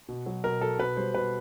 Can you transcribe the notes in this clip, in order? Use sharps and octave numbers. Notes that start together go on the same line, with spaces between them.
B2
F#3
B2 A#4
F#3 A4
B2 B4
G3 C5
B2 B4